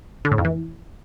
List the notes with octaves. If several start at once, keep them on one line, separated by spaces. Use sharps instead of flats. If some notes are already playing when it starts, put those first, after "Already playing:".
D3
A2
F2
E3